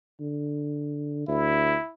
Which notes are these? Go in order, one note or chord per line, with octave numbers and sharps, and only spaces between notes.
D3
D2 E4